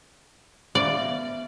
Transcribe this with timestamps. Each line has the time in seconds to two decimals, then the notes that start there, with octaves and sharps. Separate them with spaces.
0.75 D5 E5 F5
0.98 B3 E5